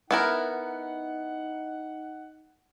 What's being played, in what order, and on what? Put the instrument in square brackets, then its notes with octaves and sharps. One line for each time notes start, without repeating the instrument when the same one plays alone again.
[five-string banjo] B3 E4 A#4 [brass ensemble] D#4 F#5